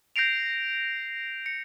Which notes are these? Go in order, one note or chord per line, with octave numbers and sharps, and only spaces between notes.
G6 A#6 C7 D7 F7
C#7